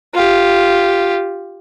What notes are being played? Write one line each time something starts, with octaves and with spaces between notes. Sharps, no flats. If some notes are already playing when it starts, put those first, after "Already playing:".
F4 G4